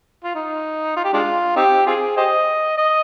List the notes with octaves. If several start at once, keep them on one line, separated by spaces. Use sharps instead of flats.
F4
D#4
F4
G4
G#3 D4 F4
C4 D#4 G4
C4 F4 G#4
G4 C5 D#5
D#5